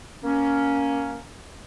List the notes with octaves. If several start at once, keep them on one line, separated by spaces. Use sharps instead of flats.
A#3 C#4